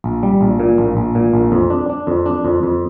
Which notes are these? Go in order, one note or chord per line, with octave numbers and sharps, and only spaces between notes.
A#1
G3
A#1
A#2
A#1
A#1
A#2
A#1
F2
D4
D4
F2
D4
F2
F2